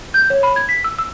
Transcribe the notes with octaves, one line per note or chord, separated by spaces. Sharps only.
G6
C#5
B5
G#6
B6
E6
E6